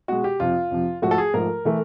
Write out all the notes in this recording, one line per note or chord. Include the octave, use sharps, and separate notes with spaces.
B2 G#3 F#4
G4
F2 C3 F3 F4
F2 C3 F3
G#2 F3 A3 F#4
A4
G#4
G#2 F3 A3 A#4
E3 A3